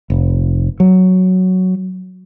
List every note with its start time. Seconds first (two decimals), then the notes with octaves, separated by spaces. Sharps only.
0.10 F1
0.80 F#3